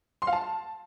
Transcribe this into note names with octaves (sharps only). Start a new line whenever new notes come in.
C6
F5
A5